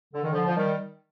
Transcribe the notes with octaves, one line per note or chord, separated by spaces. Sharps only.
D3
D#3
D3 F3
F3
D#3 G3